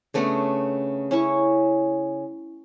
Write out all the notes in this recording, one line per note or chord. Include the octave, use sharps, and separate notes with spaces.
C#3 A3 B3 D4
C#4 E4 C#6